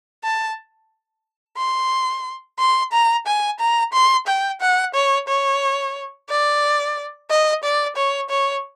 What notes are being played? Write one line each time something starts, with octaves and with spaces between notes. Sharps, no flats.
A5
C6
C6
A#5
G#5
A#5
C6
G5
F#5
C#5
C#5
D5
D#5
D5
C#5
C#5